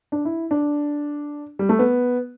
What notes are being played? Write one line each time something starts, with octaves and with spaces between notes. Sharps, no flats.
D4
E4
D4
G3
A3
B3